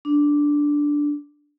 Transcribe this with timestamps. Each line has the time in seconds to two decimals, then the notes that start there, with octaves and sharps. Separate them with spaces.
0.05 D4